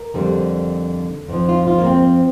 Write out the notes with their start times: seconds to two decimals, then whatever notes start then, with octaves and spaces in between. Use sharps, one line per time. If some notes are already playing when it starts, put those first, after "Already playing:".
Already playing: A#4
0.14 F2 D3 G3
1.28 F2 F3
1.49 F4
1.67 F4
1.78 A#3
1.86 C4